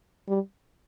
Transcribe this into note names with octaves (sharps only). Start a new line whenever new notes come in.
G3